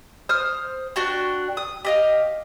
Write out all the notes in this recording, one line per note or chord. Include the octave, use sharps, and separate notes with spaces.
C5 D#6 F6
D4 F#4 G5
D#6
G4 D#5 F5